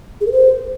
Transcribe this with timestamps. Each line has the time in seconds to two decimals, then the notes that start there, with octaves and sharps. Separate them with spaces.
0.21 G#4
0.26 A#4
0.32 C5